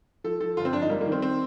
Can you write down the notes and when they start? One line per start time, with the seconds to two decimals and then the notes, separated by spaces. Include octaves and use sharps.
0.24 F3 A4
0.40 F3 A4
0.57 G1 F4
0.65 C4
0.73 F2 D4
0.82 D#4
0.89 G3 A#3
1.01 A#3
1.06 D#3
1.12 C4
1.22 C4